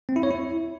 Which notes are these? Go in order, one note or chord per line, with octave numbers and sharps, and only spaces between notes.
C4
E4
C#5
E4